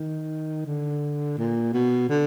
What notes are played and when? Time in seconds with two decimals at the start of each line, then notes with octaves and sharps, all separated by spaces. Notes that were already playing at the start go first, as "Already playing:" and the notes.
Already playing: D#3
0.65 D3
1.38 A#2
1.74 B2
2.09 D3